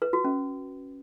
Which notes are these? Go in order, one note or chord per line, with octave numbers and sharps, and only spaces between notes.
B4
F#4
C#4